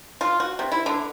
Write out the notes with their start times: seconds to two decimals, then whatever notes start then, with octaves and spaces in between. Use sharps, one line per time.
0.21 F4
0.40 F#4
0.59 C3
0.72 E4
0.86 D3